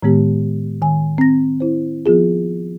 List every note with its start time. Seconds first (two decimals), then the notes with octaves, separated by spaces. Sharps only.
0.03 A2 D#3 G#3 B3 G4
0.82 D#3 G#5
1.18 C4 A#6
1.60 E4 C5
2.06 F3 B3 F4 G#4